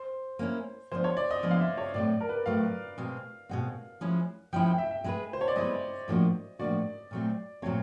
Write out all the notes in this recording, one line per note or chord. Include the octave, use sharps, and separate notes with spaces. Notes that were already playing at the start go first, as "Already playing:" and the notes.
Already playing: C5
A#3 C#4 E4
F3 G#3 B3 D4 C5
C#5
D5
D#5
F3 G#3 B3 D4
F5
E5
C#5
A2 F#3 A3 C4 D5
A#4
B4
A2 F#3 A3 C4 F5
B2 G#3 C4
B2 G#3 C4 F#5
F3 G#3 C#4 E4
F3 G#3 C#4 E4 G5
G5
E5
E5
G#3 B3 E4 G#4 B4
C5
C#5
D5
G#3 B3 E4 G#4 B4 D#5
A2 F3 A#3 D4 F#4
A2 F3 A#3 D4 F#4 D5
A#2 F#3 A3 C4
A#2 F#3 A3 C4 C#5